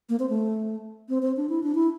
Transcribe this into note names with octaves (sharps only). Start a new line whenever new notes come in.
A#3
C4
A3
C4
C4
D4
E4
D4
E4